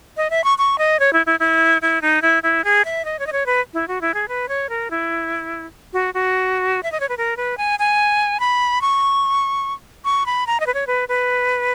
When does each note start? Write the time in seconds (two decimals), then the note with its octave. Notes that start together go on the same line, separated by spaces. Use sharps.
0.17 D#5
0.30 E5
0.44 C#6
0.58 C#6
0.78 D#5
1.00 C#5
1.13 E4
1.26 E4
1.40 E4
1.82 E4
2.02 D#4
2.22 E4
2.43 E4
2.64 G#4
2.85 E5
3.05 D#5
3.19 C#5
3.27 D#5
3.32 C#5
3.46 B4
3.74 E4
3.88 F#4
4.01 E4
4.14 G#4
4.28 B4
4.49 C#5
4.69 A#4
4.91 E4
5.93 F#4
6.14 F#4
6.83 E5
6.92 D#5
7.00 C#5
7.09 B4
7.17 A#4
7.37 B4
7.58 G#5
7.79 G#5
8.40 B5
8.81 C#6
10.05 C#6
10.26 B5
10.47 A#5
10.60 D#5
10.67 B4
10.74 C#5
10.87 B4
11.09 B4